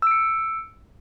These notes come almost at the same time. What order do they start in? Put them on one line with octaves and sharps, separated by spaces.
E6 D7 C#7